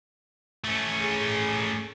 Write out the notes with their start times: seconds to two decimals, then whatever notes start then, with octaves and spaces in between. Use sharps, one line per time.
0.64 A3 C#4
1.02 G#4